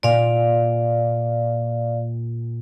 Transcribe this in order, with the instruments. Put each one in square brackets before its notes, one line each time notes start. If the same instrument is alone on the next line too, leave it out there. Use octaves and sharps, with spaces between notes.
[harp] A#2 [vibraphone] D5 F5